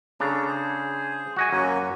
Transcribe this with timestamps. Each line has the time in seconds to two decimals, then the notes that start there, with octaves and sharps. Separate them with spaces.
0.20 C#3 D4 A4 A#5
0.48 G#4 C5
1.36 F#4 D#5 G#5
1.53 F#2 A#3 C#4 F#4